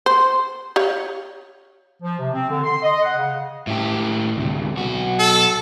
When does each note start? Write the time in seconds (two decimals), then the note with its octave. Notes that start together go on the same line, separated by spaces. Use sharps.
0.06 C5
0.76 G4 C#5 F5
2.02 F3
2.19 C3
2.33 C4
2.50 D3
2.63 C6
2.83 D#5
3.02 F#5
3.16 C#3
3.67 A2 G4
4.37 D2 C3
4.77 B1 F#4
5.19 A4